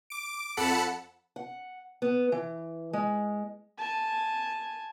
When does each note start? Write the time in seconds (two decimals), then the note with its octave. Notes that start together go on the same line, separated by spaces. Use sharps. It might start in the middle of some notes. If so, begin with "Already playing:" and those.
0.10 D6 D7
0.57 F2 A4 F#5 A5 B5 C#7
1.36 F#5
2.02 B3
2.32 E3
2.93 G#3
3.78 G#5 A5